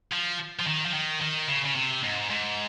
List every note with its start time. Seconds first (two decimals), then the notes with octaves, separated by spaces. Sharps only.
0.12 F3
0.59 F3
0.67 D#3
0.85 F3
0.94 D#3
1.22 D#3
1.48 C#3
1.65 C#3
1.75 C3
2.03 G#2
2.30 G#2